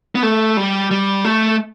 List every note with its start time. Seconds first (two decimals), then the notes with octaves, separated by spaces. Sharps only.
0.15 B3
0.23 A3
0.57 G3
0.91 G3
1.25 A3